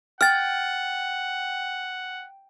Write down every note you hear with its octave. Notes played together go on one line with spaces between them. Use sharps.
F#5 G5 F6 A6